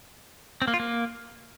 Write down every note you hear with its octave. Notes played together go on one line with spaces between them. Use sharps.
C4
A#3
F4
A#3